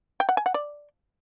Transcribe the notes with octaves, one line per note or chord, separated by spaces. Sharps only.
G5
F#5
G#5
F#5
D5